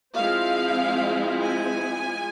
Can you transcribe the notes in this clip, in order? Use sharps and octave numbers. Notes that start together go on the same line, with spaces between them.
F3 G#3 C4 E4 F5
G#5